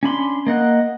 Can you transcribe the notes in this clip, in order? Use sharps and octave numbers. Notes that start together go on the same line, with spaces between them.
C#4 D4 B5 C6
A#3 D#5 F#5